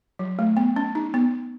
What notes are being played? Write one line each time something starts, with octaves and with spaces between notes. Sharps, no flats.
F#3
A3
B3
C#4
D#4
B3